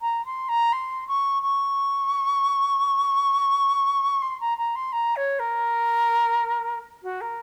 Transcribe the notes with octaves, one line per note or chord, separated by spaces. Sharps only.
A#5
C6
A#5
C6
C#6
C#6
C6
A#5
A#5
C6
A#5
C#5
A#4
F#4
A#4